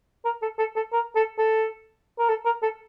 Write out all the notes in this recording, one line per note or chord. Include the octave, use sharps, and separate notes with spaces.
A#4
A4
A4
A4
A#4
A4
A4
A#4
A4
A#4
A4